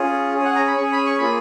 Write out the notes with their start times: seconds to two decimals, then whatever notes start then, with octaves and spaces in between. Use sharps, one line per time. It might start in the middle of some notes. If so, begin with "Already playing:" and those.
Already playing: C#4 F4 G#4
0.34 C#4 G#4
0.45 F#5
0.56 A#5
0.67 B5
0.77 C#4 C#6
0.81 G#4
0.92 B5
1.06 C#6
1.18 A#3 F4 G#4 B5